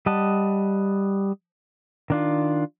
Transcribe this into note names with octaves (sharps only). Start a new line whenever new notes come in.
G3 D#5 F#5 A5
D#3 D4 F4